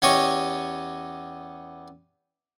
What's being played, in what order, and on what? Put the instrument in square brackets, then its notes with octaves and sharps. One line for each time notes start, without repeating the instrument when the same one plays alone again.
[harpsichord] E2 C#4 G4 C#5 D#5 C#6